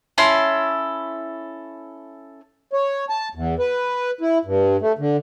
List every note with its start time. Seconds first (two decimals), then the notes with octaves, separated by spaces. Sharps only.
0.18 C#4 E4 A4 C6
2.73 C#5
3.09 A5
3.35 E2
3.59 B4
4.21 E4
4.45 G2
4.82 A3
4.99 D3